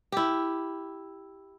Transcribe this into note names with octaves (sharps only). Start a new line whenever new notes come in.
E4 G4